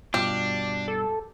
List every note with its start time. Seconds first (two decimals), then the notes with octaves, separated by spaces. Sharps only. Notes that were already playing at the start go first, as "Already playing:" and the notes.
0.14 G2 B2 D4 F4 G4
0.88 A4